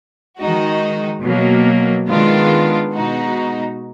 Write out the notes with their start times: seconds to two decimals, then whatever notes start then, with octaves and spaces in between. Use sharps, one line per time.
0.39 D#3 G#3 D#4 F#4
1.23 B2 F#3 A#3
2.08 D#3 G#3 B3 D4 F4
2.93 B2 G#3 D#4 F#4